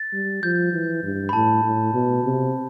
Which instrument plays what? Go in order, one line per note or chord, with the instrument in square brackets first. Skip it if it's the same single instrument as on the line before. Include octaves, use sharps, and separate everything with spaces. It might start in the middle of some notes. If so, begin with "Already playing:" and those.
Already playing: [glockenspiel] A6
[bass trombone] G3
[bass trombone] F3 [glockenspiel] G6
[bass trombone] E3
G2
[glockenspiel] B5
[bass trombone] A2 [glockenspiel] A5
[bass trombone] A2
B2
C3